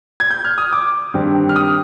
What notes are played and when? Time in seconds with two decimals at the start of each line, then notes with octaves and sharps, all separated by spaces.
0.20 G#6
0.31 G6
0.44 F6
0.58 D#6
0.73 D6
1.14 G2 D#3 G3 C4
1.49 F6
1.56 D#6